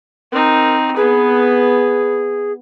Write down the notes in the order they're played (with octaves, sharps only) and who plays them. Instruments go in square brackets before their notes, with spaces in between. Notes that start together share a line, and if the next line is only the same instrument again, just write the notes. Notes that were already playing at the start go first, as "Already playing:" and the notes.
[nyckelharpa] C4 D#4 [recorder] A#4
[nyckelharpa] B3 B4 [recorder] G#4